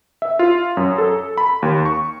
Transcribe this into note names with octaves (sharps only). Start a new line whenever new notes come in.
E5
F4
F#2
A4
B5
D#2
C#6